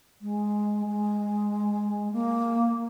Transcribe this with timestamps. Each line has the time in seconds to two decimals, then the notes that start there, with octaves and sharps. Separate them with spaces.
0.21 G#3
0.86 G#3
2.12 A#3